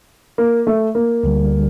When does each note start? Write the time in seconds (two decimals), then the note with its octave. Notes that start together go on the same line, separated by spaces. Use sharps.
0.38 A#3
0.67 A3
0.95 A#3
1.23 D2 D3 G3